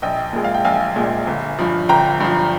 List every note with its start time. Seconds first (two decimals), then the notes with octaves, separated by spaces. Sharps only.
0.02 A#1 D#5 G5
0.33 A#2 G#3
0.44 F5
0.54 G5
0.64 A#1 F5 G#5
0.96 A#2 G#3
1.27 G1
1.59 G2 F3
1.89 G1 G5 A#5
2.20 G2 F3